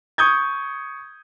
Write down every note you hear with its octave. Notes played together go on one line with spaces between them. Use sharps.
C#6 D#6 G6 G#6